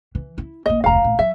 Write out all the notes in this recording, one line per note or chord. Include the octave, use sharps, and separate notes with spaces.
E3
E4
A1 A#3 D#5
F1 D2 F5 A#5
A#1 A2
F#3 E5